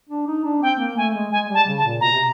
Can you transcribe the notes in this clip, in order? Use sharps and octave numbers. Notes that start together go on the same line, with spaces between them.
D4
D#4
D4
C4 G5
A#3
A3 G#5
G#3
G#3 G#5
G3
A5
C#3
A5
A#2
B2 A#5
C3